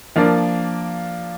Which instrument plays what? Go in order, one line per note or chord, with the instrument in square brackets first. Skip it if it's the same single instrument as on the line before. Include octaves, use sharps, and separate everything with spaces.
[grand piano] F3 A#3 D4